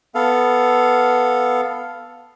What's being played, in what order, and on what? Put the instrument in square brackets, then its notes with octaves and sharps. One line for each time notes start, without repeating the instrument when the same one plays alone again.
[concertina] B3 A4 F5